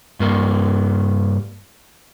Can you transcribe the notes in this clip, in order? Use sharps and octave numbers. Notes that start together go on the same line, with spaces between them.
G2 A#3